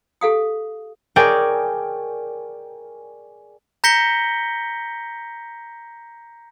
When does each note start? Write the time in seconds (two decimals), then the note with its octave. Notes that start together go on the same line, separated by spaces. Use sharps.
0.21 G4 A4 F5 D#6
1.16 G#4 A#4 C#5 D5 G5 G#5
3.84 A#5 G6 A#6 B6 C#7 G7